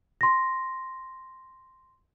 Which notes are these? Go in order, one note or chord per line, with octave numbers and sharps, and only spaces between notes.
C6 A#6